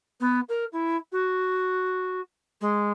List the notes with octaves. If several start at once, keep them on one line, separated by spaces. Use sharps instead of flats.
B3
A#4
E4
F#4
G#3